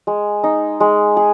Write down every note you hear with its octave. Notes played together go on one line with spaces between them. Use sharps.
G#3
D#4
G#3
G#4